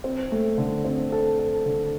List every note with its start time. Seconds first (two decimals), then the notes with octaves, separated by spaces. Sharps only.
0.04 C4
0.32 A3
0.58 D3
0.85 C4
1.12 A4
1.39 A4
1.66 D3